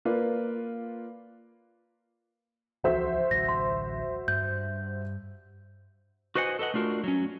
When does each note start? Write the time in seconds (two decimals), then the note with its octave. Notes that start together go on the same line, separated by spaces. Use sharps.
0.05 A#3 F4 B4 D5
2.84 C#2 E3 F3 F#4 C5 E5
3.31 A1 D2 F#3 A#6
3.49 C6
4.28 G2 G3 G6
6.35 F#4 B4 C5 D#5 F#5 G#5
6.59 A4 B4 D#5 F#5
6.74 A3 D4 F4 F#4 A#4
7.04 F#3 C#4